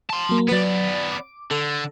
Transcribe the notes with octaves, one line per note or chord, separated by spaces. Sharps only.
A5 C6
F#3 A#3
F#3 B3 B4 D5
D6
D3 A4